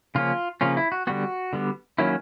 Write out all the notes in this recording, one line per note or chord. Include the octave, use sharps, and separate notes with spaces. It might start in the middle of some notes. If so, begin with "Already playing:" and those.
C#3 F3 A#3 C#4 F4
C#3 F3 A#3 C#4 F4
E4
F#4
D3 G3 B3 F#4
D3 G3 B3
D#3 F#3 A#3 C#4 E4